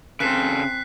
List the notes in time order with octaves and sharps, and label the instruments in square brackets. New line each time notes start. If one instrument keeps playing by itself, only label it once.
[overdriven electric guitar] C#3 A4 [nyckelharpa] C4 [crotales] F#6 B6 C7